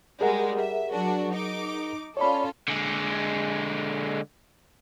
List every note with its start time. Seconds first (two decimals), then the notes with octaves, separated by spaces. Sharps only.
0.21 G3 G#3 G#4 A#4 F#5
0.61 E5
0.92 F#3 D4 F#4
1.33 D#4 D6
2.17 C#4 F4 A4 C#5 D5 B5
2.68 D3 G#3